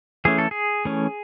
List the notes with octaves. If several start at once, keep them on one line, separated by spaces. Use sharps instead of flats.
E3 A3 C#4 G#4
A4
G#4
E3 A3 C#4